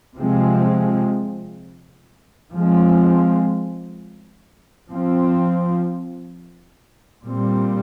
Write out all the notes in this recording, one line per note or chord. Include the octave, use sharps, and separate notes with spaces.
C3 F3 G#3 C4
F3 G#3 C4
F3 C4
A#2 G3 C4